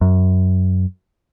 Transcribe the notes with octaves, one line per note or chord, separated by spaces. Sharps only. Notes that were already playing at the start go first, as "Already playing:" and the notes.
F#2